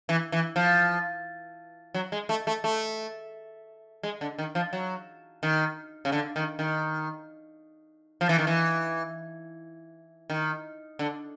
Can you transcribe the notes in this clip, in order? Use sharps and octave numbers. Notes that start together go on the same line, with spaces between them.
E3
E3
F3
F#3
G#3
A3
A3
A3
G#3
D3
D#3
F3
F#3
D#3
C#3
D3
D#3
D#3
F3
E3
D#3
E3
D#3
D3